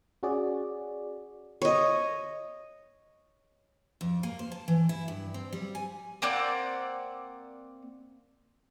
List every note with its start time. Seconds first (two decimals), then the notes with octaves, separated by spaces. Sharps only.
0.23 C#4 F#4 G#4 D5
1.62 C#5 D#5
4.01 F2
4.23 A#3
4.39 C5
4.52 A5
4.68 E3
4.89 E4
5.08 G2
5.34 C4
5.53 G3
5.75 G#5
6.22 A#3 C4 D5 F#5